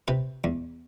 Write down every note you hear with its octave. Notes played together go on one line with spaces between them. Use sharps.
C3 B4
E2